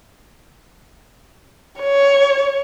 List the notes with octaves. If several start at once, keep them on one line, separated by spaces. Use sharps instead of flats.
C#5